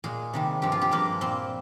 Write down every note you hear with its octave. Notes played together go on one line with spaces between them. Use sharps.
A#2 G#3 G#4
C3 D#3 G3
G2 D3 F3 G#3 G4
F4
G4
G2 F3 G#3 A#3
A#2 G3 C4